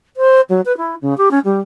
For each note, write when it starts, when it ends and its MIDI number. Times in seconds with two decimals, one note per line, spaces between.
0.16 0.40 72
0.49 0.61 54
0.65 0.75 71
0.77 0.95 64
1.01 1.16 49
1.17 1.29 67
1.31 1.39 61
1.44 1.60 55